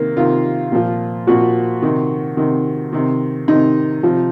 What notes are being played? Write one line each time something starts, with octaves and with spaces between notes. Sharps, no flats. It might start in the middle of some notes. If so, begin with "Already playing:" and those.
Already playing: C3 D#3 A#3
C3 D#3 F4
A#2 F3
A#2 F3 F#4
C3 D#3
C3 D#3
C3 D#3
C3 D#3 D#4
C3 F3